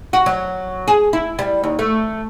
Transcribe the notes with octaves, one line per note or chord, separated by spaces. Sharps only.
F#4
F#3
G#4
E4
G3
D#2
A3